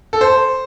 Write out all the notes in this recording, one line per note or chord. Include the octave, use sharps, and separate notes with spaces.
A4
C5